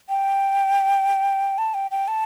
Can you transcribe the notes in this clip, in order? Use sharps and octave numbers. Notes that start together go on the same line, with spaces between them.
G5
A5
G5
G5
A5